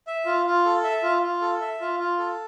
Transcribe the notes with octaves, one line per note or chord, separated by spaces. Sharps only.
E5
F4
F4
A4
E5
F4
F4
A4
E5
F4
F4
A4